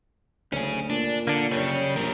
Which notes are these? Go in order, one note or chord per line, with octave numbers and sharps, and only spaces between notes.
F#1 D2 C#4 G#4
A#2 D4
D3 A#3 D4
F#2 C#3 G3 C#5
A#1 G3 A#4